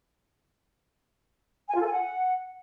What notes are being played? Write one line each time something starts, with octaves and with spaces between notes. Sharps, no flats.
G#5
F4
A4
G#5
F#5